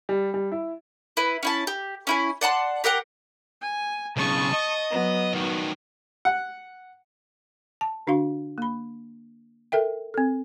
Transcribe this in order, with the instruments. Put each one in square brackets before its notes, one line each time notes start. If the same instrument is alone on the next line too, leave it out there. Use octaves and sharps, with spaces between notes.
[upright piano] G3
G3
E4
[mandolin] E4 B4
C#4 E4 A5
G4
C#4 E4 G#5
D5 F#5 A5 C6
G4 A#4 F#5 G5
[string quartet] G#5
[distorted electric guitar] B1 C#3 [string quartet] A5 C#6 D#6
[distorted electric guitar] D#5
[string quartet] F#3 B3
[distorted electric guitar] D#3 F#4
[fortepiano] F#5
[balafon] A5
D3 D4 F#4 F5 C6
A#3 B5
A4 A#4 E5 G5
C4 A4